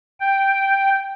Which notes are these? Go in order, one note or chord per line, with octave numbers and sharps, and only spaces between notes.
G5